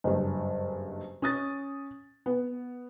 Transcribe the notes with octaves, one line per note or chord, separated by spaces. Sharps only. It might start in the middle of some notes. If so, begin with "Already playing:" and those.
F#1 G2
C#4 D#6 A6
B3